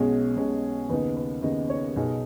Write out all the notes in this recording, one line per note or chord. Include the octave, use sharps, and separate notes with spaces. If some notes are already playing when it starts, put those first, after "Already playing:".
Already playing: B1 B2 G#3 C#4 G#4
B1 B2 G#3 C#4
D#2 C#3 B3 D#4 B4
B4
D#2 C#3 B3 D#4 D#5
C#5
B1 B2 B3 D#4 G#4